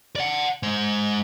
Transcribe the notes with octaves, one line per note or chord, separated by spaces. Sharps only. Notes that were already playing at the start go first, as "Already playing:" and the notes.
D5 F#5
G#3 C5